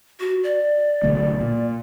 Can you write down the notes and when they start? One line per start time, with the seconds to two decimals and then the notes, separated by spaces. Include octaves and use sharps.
0.20 F#4
0.44 D5
1.03 B1 D3 A3
1.41 A#2